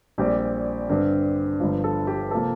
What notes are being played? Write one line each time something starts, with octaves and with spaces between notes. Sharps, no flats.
A#1 A#2 G3 C4 G4
G2 D3 G3 C4
G1 G2 F3
A4
G4
C3 F3 A#3 A4